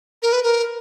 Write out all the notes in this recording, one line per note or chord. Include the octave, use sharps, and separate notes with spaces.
A#4
B4
A#4